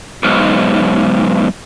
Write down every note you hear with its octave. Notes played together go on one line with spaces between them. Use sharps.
B1 G#2